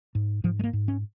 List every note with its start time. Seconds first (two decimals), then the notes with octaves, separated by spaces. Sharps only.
0.15 G#2
0.44 G#2 F3
0.59 G#3
0.64 A#3
0.73 G#2
0.88 C#4